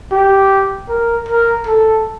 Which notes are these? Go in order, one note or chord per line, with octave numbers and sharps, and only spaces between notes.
G4
A#4
A#4
A4